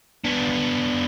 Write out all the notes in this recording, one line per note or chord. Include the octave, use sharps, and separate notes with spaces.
B3 D4